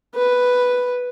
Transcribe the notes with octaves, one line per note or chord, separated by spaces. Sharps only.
B4